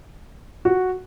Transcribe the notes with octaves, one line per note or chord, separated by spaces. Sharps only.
F#4